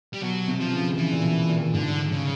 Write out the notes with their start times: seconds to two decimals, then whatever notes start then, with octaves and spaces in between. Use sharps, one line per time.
0.14 G3
0.22 B2 F#3
0.48 C3
0.60 F3
0.73 C#3
0.98 C#3 E3
1.12 A#2
1.23 B2
1.49 A#2
1.74 G#2 D3
2.12 C#3